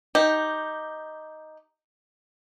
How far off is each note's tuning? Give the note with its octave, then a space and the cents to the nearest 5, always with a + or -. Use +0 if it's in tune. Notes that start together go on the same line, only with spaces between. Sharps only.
D#4 +0 G4 +0